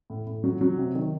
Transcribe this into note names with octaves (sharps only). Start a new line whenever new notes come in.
A2
A2
F#3
F#3
C3
D#3